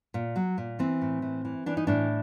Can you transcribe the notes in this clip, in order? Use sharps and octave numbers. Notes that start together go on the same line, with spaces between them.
A#2
F#3
A#2
E3 C4
A2
E3
E3
E3 D4
D#4
A2 D4